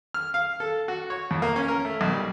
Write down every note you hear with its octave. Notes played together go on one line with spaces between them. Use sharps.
F6
F5
A4
F#4
C#5
F2
A#3
C#4
A#4
A3
B1
G3